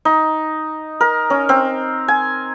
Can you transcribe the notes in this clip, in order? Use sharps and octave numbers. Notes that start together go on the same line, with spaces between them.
D#4
A#4
C#4
C4
G#5